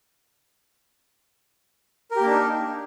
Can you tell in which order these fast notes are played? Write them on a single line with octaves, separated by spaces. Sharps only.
A#4 G4 A#3 D4 D#4